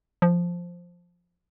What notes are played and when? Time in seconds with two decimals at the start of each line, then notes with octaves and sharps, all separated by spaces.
0.22 F3